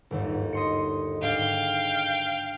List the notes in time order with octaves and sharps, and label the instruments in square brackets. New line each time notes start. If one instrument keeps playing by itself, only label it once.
[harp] G1 D#2 G#2
D#5 C6 C#7
[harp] G#2 D4 [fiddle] F5 G5